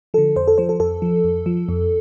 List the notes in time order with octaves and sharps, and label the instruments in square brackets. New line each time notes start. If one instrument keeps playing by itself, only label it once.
[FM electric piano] D3 F3 A4
F2 C5
A4
F3 C5
A4
F2 A4
F3
F2
F3
F2